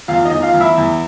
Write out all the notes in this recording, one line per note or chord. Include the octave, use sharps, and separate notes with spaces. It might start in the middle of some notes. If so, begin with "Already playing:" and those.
E2 F4 F5
D#4 D#5
E2
F4 F5
E2
E4 E5
E2